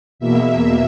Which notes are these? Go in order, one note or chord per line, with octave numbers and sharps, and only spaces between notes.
E2 B2 A#3 E5